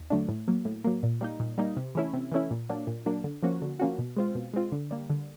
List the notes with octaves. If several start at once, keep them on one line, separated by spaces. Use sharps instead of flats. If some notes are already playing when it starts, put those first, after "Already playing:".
Already playing: D#2
D3 F#3 A3 D4
A2
F#3 A#3
A2
F#3 A#3
A#2
G3 A#3 D#4
A#2
G3 A#3 D#4
C3
E3 A3 C#4 E4
C3
E3 A3 C#4 E4
A#2
F#3 A#3 D4
A#2
F#3 A#3 D4
D3
F3 A#3 C#4 F#4
D3
F3 A#3 C#4 F#4
B2
G#3 C4 F4
B2
G#3 C4 F4
D3
G3 A#3
D3